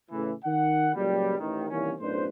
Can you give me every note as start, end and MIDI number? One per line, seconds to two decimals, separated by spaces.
0.10 0.31 45
0.10 0.31 49
0.10 0.31 52
0.45 0.89 51
0.45 0.89 78
0.94 1.36 37
0.94 1.36 46
0.94 1.36 54
0.94 1.36 55
1.38 1.69 33
1.38 1.69 51
1.69 1.92 36
1.69 1.92 51
1.69 1.92 52
1.69 1.92 58
1.69 1.92 61
1.99 2.27 35
1.99 2.27 42
1.99 2.27 45
1.99 2.27 62
1.99 2.27 71
1.99 2.27 72